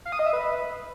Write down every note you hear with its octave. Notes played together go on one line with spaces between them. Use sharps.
F5
D#6
D#5
E5
B4